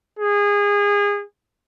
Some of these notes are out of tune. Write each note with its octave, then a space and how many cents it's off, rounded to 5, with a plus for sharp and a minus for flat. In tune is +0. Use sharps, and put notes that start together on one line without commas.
G#4 -25